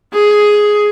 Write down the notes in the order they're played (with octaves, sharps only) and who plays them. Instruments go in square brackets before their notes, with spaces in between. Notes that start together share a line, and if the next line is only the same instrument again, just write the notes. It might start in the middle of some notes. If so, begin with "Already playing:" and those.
[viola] G#4